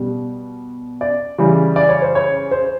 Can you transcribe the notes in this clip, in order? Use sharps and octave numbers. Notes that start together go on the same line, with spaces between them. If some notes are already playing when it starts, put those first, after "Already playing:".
Already playing: B2 G3
D5
C#3 E3 G3
D5
C#5
C5
C#5
C5